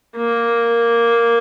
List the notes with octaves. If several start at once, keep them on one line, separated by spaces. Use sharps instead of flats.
A#3